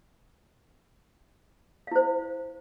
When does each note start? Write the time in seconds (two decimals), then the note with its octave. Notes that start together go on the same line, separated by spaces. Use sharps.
1.87 F5
1.91 E4
1.96 C5